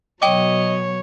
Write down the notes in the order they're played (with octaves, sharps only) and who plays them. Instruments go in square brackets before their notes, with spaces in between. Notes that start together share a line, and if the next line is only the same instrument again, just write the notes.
[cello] B2 F#3 [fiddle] C#5 [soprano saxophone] D#5 [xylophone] G5 D6